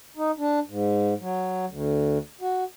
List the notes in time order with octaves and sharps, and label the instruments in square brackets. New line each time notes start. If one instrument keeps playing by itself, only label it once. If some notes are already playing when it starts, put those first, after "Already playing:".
[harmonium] D#4
D4
G#2
F#3
D2
F#4